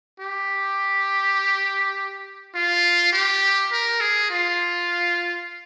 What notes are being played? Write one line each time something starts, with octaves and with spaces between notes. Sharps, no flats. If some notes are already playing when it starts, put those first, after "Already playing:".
G4
F4
G4
A#4
G#4
F4